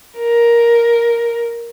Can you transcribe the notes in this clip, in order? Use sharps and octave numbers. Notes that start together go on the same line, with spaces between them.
A#4